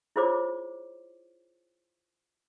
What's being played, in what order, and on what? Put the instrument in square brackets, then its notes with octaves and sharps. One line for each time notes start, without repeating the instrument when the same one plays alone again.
[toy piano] E4 F4 G#4 C5 C#5 D6